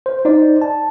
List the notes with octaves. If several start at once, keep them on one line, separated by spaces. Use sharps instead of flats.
C5
D#4 C5 D5
A5